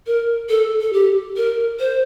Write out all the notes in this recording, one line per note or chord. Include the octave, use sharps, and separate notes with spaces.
A#4
A4
A4
G4
A#4
C5